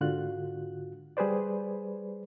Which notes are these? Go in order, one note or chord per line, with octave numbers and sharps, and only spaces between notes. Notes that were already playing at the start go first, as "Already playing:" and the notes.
G#2 D3 F4 F#4 F#6
G3 G#4 B4 C5 D5